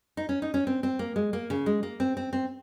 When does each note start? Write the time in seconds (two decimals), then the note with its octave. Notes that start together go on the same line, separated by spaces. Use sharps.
0.17 D#4
0.29 C#4
0.42 D#4
0.54 C#4
0.67 C4
0.83 C4
0.99 A#3
1.16 G#3
1.33 A#3
1.50 C#3
1.66 G#3
1.83 A#3
2.00 C4
2.17 C4
2.33 C4